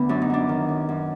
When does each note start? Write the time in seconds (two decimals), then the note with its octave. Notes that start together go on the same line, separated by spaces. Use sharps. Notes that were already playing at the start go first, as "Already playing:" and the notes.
Already playing: D2 D3 B3
0.09 F#2 D4
0.22 D#4
0.30 F#2 D4
0.49 D#3
0.69 F#2
0.89 F#2